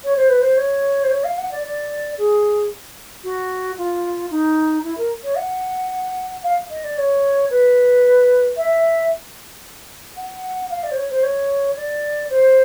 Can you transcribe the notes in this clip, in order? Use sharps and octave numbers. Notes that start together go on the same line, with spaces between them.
C#5
C5
B4
C5
C#5
C5
C#5
F5
F#5
D5
D5
G#4
F#4
F4
D#4
E4
A#4
C#5
F#5
F5
D#5
D5
C#5
B4
E5
F#5
F5
D5
C5
C#5
C5
C#5
D5
C5